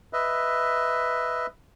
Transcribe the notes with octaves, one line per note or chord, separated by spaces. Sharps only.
B4 D#5 E5